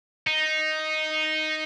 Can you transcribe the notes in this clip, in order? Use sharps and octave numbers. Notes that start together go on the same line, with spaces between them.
D#4